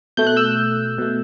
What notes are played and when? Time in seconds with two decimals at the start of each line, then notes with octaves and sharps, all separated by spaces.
0.17 B2 A3 G6
0.27 F#6
0.36 E6 G6
0.98 B2 A3